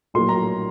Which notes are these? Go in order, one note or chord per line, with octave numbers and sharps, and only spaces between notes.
A#1 A2 F#3 A#3 C6
A#5